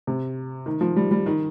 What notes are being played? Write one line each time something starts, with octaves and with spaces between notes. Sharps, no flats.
C3
D#3
F3
G3
G3
D#3